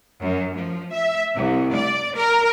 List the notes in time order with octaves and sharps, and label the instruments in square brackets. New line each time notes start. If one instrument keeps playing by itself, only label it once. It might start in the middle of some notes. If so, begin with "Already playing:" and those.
[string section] F#2
F3
E5
C2
D5
A#4